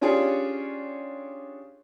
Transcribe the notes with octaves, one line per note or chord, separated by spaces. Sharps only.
C#4 D4 F4 G4 G#4 C#5